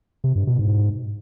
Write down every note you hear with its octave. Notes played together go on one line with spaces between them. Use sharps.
C3
G2
B2
G#2